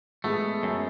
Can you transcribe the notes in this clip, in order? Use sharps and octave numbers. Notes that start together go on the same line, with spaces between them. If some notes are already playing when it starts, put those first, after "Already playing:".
G#3 A3 B3
F#2